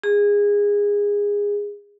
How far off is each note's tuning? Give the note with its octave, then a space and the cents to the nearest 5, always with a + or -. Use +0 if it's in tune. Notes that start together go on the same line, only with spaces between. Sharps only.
G#4 -20